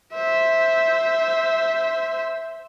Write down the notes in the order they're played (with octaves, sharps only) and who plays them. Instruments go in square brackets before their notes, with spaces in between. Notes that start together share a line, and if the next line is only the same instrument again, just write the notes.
[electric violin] C5 E5